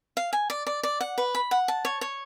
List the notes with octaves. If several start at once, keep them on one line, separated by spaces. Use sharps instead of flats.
F5
G#5
D5
D5
D5
F#5
B4
B5
F#5
A5
C#5
C#5